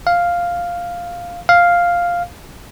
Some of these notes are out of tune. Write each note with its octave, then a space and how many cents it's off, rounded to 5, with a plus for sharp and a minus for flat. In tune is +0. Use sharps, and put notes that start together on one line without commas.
F5 +0
F5 +0